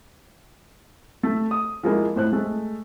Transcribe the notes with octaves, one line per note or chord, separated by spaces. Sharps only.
A3
D#6
F3 G#3 A#3 E4
A2 C5 F#6
G#3 A3